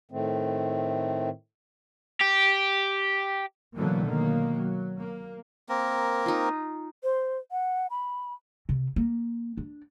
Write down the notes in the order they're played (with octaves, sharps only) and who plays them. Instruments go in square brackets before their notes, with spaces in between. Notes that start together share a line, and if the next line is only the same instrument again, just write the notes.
[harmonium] A2 D#3 A3 C4
[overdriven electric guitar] G4
[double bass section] B2 D3 E3 F#3 A3 A#3
B2 D#3 F#3 A#3
F#3
A#3
[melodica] A#3 C4 A#4
[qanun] D#4 F4
[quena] C5
F#5
B5
[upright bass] C3
A#3
D4